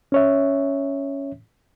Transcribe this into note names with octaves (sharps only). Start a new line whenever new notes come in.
C#4 C#5 E5